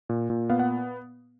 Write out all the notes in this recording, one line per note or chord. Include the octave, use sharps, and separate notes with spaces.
A#2
A#2
B3 F5
F#5